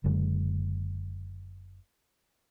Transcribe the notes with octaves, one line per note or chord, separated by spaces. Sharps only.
F#1 F#2 D3 G#3